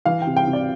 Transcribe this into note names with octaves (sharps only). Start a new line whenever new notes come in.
E3 F5
G5
C3
G5
C3
D5